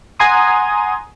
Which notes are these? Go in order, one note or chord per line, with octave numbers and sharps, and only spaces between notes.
F#5 G#5 A#5 C6 D#6